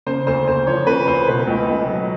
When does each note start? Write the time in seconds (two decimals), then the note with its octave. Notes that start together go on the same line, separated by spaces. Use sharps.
0.06 C#3 C5
0.27 D2 C5
0.47 D2 C5
0.67 F3 C#5
0.87 C#3 B4
1.07 D2 C5
1.27 B2 B4
1.47 C#2
1.67 C#2
1.87 F#3